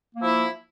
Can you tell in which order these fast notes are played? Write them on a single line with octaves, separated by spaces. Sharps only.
A#3 F3 E4